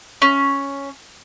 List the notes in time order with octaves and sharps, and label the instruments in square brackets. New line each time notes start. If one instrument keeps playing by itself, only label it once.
[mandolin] C#4